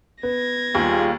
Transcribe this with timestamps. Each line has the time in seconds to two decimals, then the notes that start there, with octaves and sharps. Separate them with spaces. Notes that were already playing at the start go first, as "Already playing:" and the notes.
0.23 B3 G#6 A#6
0.75 D#2 G3 F4 G#4